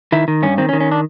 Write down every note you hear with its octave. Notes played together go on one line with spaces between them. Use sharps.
D#3 E4
D#3
G2 C#4
D#3 C4
C#4
D#3
C#4
D4